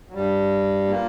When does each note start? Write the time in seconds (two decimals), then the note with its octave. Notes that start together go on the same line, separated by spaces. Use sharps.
0.09 F#3
0.14 G2 G3
0.88 A#2 A#3